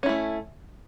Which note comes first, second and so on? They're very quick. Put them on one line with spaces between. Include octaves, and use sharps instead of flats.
C#4 E4 A3